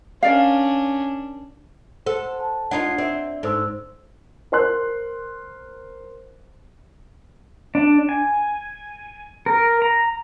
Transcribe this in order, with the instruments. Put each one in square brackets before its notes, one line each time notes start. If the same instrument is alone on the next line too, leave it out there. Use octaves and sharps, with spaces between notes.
[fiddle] C#4 D4 [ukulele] A#4 D5 F5
[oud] A4 [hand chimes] C5 F#5
[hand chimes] A5
[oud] D4 D#4 F4 [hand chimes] F#5 G#6 C7
[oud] C4 [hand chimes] D5 E5
[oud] G#2 [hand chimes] A4 C5 E6
[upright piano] A#4 C5 C6 F#6
[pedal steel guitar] D4
G#5
A#4
A#5